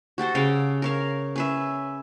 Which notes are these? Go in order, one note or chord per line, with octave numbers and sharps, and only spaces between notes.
F#4 G4 A4 C5
C#3 F5 G5 D6
A#4 C#5 F5
C#4 B4 E5